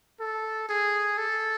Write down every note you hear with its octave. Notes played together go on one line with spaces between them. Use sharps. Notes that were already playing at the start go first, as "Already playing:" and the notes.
A4
G#4
A4